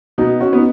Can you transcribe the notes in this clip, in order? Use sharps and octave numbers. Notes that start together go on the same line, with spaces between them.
B2 B3 D#4
C#4 F#4
B3 D#4